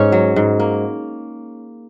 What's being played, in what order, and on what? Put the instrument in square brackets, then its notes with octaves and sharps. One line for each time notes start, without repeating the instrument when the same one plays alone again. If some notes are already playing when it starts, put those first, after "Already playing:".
Already playing: [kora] G#2 C#4 C#5
F#3
G#2
A#3